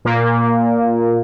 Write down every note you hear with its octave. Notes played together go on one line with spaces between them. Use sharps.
A#2 A#3